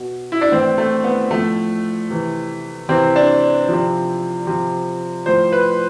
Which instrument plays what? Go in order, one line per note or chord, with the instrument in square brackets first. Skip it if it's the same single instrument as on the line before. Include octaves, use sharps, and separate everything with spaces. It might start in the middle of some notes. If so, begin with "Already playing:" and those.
Already playing: [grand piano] B2
E4
D4
A2 E3 C4
A3
B3
A2 F3 A3
C3 E3
C3 E3 C4
D4
C3 F3
C3 F3
A2 F3 C5
B4